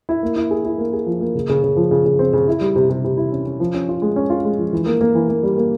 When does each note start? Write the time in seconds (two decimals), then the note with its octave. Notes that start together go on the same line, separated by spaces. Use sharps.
0.09 E4
0.23 A#3
0.36 E4
0.51 G#4
0.65 E4
0.78 A#3
0.93 G#4
1.06 F3
1.20 A#3
1.35 C#3
1.49 C#3
1.64 C#3
1.76 F3
1.91 C#3
2.05 C#3
2.19 C4
2.33 C#3
2.48 E4
2.61 G3
2.76 C3
2.90 C3
3.04 C3
3.17 E4
3.32 C#4
3.46 C#4
3.60 F3
3.74 C#4
3.89 F4
4.02 G#3
4.16 C#4
4.30 F4
4.45 G#3
4.59 F3
4.73 E3
4.86 A#3
5.01 A#3
5.15 E3
5.29 A#3
5.43 G3
5.58 A#3